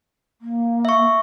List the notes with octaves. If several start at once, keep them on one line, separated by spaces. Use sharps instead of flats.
A#3
E5 C#6